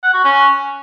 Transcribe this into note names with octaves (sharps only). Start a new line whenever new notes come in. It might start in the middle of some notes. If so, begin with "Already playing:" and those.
F#5
F#4
C#4